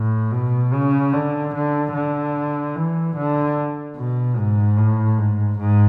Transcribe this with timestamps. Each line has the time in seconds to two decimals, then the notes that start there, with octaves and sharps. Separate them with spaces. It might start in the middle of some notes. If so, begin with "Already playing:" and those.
Already playing: A2
0.32 B2
0.73 C#3
1.13 D3
1.54 D3
1.94 D3
2.76 E3
3.16 D3
3.97 B2
4.37 G#2
4.77 A2
5.18 G#2
5.58 G#2